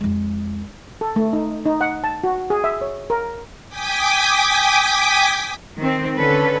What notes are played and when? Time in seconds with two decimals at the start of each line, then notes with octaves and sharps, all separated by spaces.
0.01 F2 G#3
1.01 A4
1.16 A3
1.33 D#4
1.65 D#4
1.81 F#5
2.04 A5
2.24 F#4
2.50 G#4
2.64 E5
2.81 C#5
3.10 A#4
3.69 G5 G#5 D6 D#6 B6
5.78 D#3 C4
6.18 D3 C#4 A4 B4